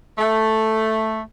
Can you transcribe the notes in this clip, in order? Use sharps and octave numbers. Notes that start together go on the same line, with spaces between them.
A3